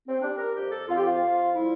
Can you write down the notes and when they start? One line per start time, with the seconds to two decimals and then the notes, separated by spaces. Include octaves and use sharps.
0.08 C4
0.21 G3 D4
0.38 A#4
0.55 F2 G4
0.71 A4
0.88 F2 F4
0.96 G4
1.05 F4
1.21 F2
1.55 G3 E4